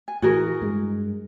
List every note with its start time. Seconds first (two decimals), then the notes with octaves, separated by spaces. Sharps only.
0.08 G#5
0.22 A2 E3 F#4 G#4 A#4
0.61 G2 G#3